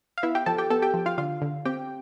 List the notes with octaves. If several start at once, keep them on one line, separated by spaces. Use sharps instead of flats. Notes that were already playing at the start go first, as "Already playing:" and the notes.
F5
B3 E4 E5
G4 G5
F3 A4 A5
G4 G5
B3 A4 A5
G4 G5
F3
F4 F5
D3 F4 F5
D3
C4 G4 G5